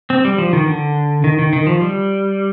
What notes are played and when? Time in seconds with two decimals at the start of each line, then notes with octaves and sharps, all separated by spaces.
0.10 C4
0.25 G3
0.38 F3
0.53 D#3
0.67 D3
1.24 D#3
1.39 D#3
1.53 D#3
1.67 F3
1.81 G3